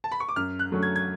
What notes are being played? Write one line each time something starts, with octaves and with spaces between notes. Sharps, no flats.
A5
B5
C#6
D6
F#2 F6
F#6
D3 F#3 A3 C#4
G#6
G#6